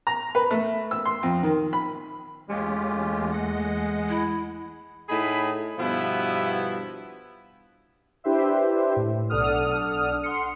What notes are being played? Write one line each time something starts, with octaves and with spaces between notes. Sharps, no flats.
A#5
B4
A3
E6
C6
F2
D#3
B5
E2 E3 G#3 A3 C#4 F4 G4
D#5 F#5
E4
A2 D#4 G#4 B5
G2 B2 F3 B3 E4
D4 E4 G4 B4 C5 E5
A2
B1 D4 A4 F#5 D#6 F6
F#5 C6 C#7